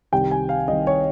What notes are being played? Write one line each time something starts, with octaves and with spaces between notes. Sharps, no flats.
C2 C3 D#3 G5
G#5
F5
C2 C3 D#3 D#5
C#5